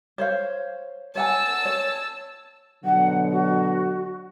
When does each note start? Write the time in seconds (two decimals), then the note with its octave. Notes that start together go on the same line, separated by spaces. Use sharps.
0.18 C5 C#5 F5
1.15 C#5 F#5 G#5 A5 E6
1.65 C#5
2.85 B2 D3 F#3 F#5
3.31 F#4